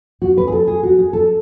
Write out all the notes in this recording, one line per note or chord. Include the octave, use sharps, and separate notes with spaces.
F#4
B4
G#4
A4
G#4
F#4
G#4
A4